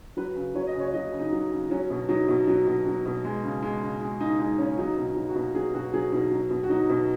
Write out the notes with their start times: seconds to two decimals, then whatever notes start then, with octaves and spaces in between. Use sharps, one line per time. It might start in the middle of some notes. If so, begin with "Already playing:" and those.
0.17 F#3 B4
0.36 C#3
0.55 F#3 C#5
0.67 D#5
0.75 C#3 C#5
0.94 F#3 D#5
1.12 C#3
1.20 D#4
1.33 F#3
1.51 C#3
1.70 F#3 C#4
1.90 B2
2.09 F#3 D#4
2.28 B2
2.48 F#3
2.67 B2
2.86 F#3
3.06 B2
3.24 G#3
3.44 C#3
3.62 G#3
3.82 C#3
4.01 G#3
4.20 C#3 D#4
4.40 G#3 D#4
4.58 C#3 C#4
4.78 F#3 D#4
4.97 B2
5.04 D#4
5.16 F#3
5.29 F#4
5.36 B2
5.54 F#3 G#4
5.74 B2 F#4
5.94 F#3 G#4
6.12 B2 D#4
6.31 F#3
6.50 B2
6.63 F#4
6.69 F#3 D#4
6.89 B2